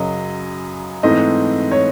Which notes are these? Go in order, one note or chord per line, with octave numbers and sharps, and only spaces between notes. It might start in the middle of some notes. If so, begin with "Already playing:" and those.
Already playing: F#2 C#3 F#3 D#5
G#2 E3 A3 C4 D#5
C#5